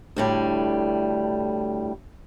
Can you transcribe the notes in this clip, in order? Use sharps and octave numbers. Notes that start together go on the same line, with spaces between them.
D2 A2 G3